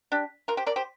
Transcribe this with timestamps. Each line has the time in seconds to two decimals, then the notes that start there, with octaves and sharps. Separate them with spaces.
0.12 D4 G4
0.48 F4 A#4
0.57 G4 C5
0.66 A#4 D5
0.76 G4 C5